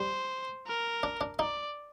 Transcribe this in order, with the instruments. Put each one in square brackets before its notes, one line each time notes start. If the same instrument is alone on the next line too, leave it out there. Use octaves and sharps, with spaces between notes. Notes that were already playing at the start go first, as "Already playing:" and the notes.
Already playing: [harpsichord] G3 [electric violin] C5
[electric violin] A#4
[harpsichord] D4
D4
[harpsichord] D#4 [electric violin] D5